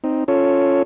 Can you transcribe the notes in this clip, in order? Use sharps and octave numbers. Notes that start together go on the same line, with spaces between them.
C4 D#4
C#4 F4 A4 C#5